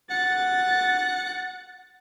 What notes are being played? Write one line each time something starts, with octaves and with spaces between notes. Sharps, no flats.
F#5 A6